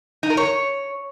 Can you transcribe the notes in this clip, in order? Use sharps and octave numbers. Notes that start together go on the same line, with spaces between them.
D#4
A#4
C#5